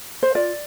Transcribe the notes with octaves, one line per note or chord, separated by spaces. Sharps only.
C5
F4 D5